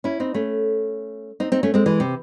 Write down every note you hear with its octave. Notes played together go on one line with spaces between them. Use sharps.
C#4 E4
C4 D#4
A3 C#4
C4 D#4
C4 D#4
A3 C#4
G#3 C4
E3 G#3
C3